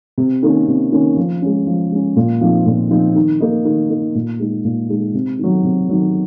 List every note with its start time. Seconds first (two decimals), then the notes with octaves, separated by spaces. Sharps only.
0.18 C3
0.43 D#3 A#3 C#4
0.67 C3
0.92 D#3 A#3 C#4
1.17 F3
1.42 G#3 C#4
1.67 F3
1.92 G#3 C#4
2.16 A#2
2.41 F3 C4 D#4
2.66 A#2
2.91 F3 C4 D#4
3.16 D#3
3.41 A#3 D#4
3.65 D#3
3.90 A#3 D#4
4.15 A#2
4.40 G#3 D#4
4.65 A#2
4.89 G#3 D#4
5.14 C3
5.39 D#3 F#3
5.64 C3
5.89 D#3 F#3